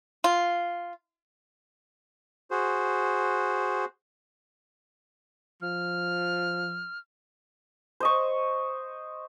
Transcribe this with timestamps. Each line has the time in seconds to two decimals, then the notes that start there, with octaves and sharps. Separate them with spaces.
0.24 F4
2.51 F#4 G#4 C5
5.62 F3 F6
8.00 C5 D#5 C#6